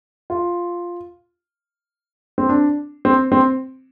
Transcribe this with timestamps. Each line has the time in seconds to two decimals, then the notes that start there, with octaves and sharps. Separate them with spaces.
0.30 F4
2.38 C4
2.49 D4
3.05 C4
3.32 C4